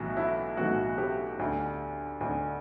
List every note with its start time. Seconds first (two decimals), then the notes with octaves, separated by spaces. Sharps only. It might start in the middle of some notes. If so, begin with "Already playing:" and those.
Already playing: B1 A2 E3 F#4
0.17 E4
0.57 B1 A2 E3 F#4
0.98 G4
1.39 D2 D3
2.21 D2 D3